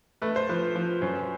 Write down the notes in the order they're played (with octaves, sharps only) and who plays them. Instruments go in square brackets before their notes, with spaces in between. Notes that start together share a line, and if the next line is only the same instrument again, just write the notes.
[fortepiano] A3 [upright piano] B4
[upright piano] C5
[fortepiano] F3 [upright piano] B4
[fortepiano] F3
[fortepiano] F#2 [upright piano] C5